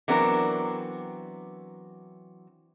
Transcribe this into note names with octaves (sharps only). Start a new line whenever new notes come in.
E3 F#3 B3 C4 D4 A#4